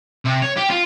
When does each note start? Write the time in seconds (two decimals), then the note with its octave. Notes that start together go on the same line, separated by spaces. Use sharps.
0.25 C3
0.42 C#5
0.57 G4
0.70 F4